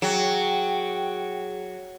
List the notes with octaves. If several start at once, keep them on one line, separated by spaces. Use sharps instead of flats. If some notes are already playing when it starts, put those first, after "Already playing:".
F#3 G#4 G5